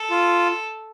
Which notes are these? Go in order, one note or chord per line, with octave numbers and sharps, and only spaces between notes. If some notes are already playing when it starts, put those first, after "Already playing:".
Already playing: A4
F4